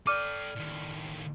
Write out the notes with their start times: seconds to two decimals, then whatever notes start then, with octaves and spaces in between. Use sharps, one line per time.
0.07 A4 D5 G5 D6 F6 D#7
0.55 D#2 A2